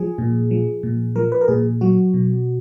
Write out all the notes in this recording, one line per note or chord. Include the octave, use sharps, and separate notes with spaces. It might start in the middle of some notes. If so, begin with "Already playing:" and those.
Already playing: F3 G#4
A#2
F3
A#2
F3 A#4
B4
A#4
A#2 G#4
F#3 F#4
B2